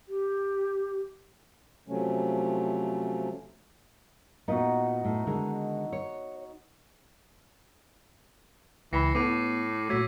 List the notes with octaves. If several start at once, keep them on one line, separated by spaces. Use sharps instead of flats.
G4
C3 F3 F#3 A3 C#4
A#2 B3 D#4 F#4
A2
D3 D#3 G#3
C#5
C#2 E3 B5 A#6 C7 C#7
A2 B3 D6 C7 D#7
A#2 F#3 A3 E6 G#6 B6